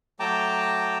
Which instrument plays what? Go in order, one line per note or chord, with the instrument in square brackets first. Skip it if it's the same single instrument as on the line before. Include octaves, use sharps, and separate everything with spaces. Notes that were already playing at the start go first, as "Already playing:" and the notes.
[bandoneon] F#3 A3 G5 A5 A#5 D6